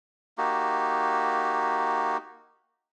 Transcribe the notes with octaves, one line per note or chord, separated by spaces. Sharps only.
A#3 D#4 F#4 G4